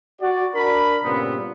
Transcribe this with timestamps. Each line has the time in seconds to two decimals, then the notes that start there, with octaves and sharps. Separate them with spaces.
0.21 F#4 D5
0.55 D4 A#4 B5
1.05 G2 A#2 C#3 B3 C4